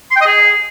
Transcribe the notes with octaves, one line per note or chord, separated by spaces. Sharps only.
C6
G5
D#5
G#4